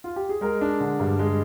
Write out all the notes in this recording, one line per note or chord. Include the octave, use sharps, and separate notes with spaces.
F4
G4
G#4
G#3 A#4
D4
D3
G2
G#3